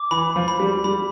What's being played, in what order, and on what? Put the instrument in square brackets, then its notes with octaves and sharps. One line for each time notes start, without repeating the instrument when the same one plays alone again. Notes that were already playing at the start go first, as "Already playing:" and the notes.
Already playing: [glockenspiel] D6
[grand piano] E3 [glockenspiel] B5
[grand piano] F3
[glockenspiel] B5
[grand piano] G3
[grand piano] G3 [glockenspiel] B5